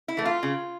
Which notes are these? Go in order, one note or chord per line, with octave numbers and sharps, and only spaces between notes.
E4
E3 A3
F4
C#3